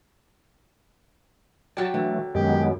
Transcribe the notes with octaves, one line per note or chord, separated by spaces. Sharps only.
F#3 G4 D5 A5
D3 E3 F#3 A3
F#2 D#3 G#3 B3 G4